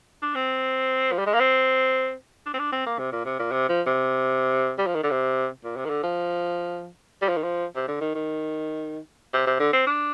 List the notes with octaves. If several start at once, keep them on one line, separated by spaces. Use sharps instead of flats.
D4
C4
F3
G3
G#3
A#3
C4
D4
C4
D4
C4
A#3
C3
A#2
C3
A#2
C3
F3
C3
G3
F3
D#3
D3
C3
A#2
C3
D#3
D3
F3
G3
F3
D#3
F3
C3
D3
D#3
D#3
C3
C3
D3
C4
D4